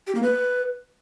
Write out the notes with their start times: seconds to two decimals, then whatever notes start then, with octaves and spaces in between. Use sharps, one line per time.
0.07 G4
0.15 A#3
0.23 B4